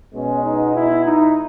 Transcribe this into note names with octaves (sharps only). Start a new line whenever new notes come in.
B2 G#3 B3 C#4
D#4
E4
D#4